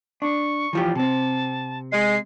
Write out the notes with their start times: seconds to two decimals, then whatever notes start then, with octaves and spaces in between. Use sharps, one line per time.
0.22 D4 C#6
0.73 E3 F3 G4
0.95 C3 C4 A5
1.92 G#3 C7